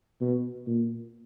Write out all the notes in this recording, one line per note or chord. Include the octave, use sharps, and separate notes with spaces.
B2
A#2